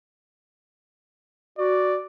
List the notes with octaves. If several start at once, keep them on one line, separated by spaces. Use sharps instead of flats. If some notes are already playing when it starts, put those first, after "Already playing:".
F#4 D5